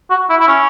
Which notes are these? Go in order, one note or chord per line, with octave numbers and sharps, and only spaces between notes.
F#4
E4
E4
C#4